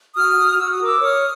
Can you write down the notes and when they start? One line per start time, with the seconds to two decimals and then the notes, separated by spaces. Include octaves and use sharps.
0.16 F#4 D#6 F6
0.37 F#4
0.58 F#4 E6
0.71 D#6
0.80 A#4 D6 E6
1.01 C#5 D#6 F6